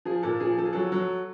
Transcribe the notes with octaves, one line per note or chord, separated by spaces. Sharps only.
F3 G#4
A#2 A4
F3 G#4
F3 A4
G#4
F#3 A4
F#3